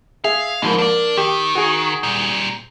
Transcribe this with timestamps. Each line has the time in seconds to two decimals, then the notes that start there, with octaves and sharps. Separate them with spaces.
0.24 G#4 E5 F5
0.62 G#2 C#3 E3 F3 A#3
0.78 A#3 D4 D5
1.17 D#3 G4
1.55 F#4 G#4
2.03 A#2 G3